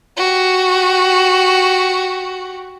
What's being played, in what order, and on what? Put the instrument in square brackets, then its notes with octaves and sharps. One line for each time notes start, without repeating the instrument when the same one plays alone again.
[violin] F#4 G4